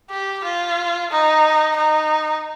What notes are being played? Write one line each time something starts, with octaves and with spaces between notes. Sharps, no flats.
G4
F4
D#4
D#4